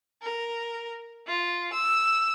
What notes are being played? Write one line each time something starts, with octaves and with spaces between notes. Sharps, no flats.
A#4
F4
E6